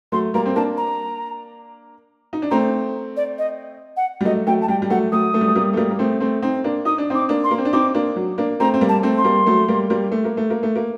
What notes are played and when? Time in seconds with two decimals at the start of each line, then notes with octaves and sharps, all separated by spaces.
0.12 F#3 A3 C6
0.34 G3 A#3 A#5
0.46 C4
0.56 A#3 D4 A5
0.77 A#5
2.33 D#4
2.42 D4
2.51 A3 C4 A#5
3.17 D5
3.38 D#5
3.97 F#5
4.21 G3
4.25 F#3 A3 D#5
4.47 F#3 A3 G5
4.62 A5
4.68 G3 G5
4.82 G3
4.90 F#3 A3 F#5
5.12 F#3 A3 D#6
5.34 F#3 A3
5.41 G3
5.48 A3
5.55 G3 A#3
5.73 A3
5.77 G3 A#3
5.90 A#3
5.99 A3 C4
6.20 A3 C4
6.42 C4 D#4
6.64 A#3 D4
6.85 D#4 D#6
6.98 D4
7.10 C4 D#4 D6
7.29 A#3 D4
7.44 C6
7.51 A#3
7.58 C4
7.65 D4
7.73 C4 D#4 D6
7.94 A#3 D4
8.16 F#3
8.38 A#3 D4
8.60 A3 C4 A#5
8.74 C4
8.81 G3 A#3
8.89 A5
9.03 A3 C4
9.18 C6
9.24 G3 A#3
9.46 F#3 A3
9.68 G3 A#3
9.90 G3 A#3
10.12 A3
10.25 A#3
10.37 A3
10.50 A#3
10.63 A3
10.76 A#3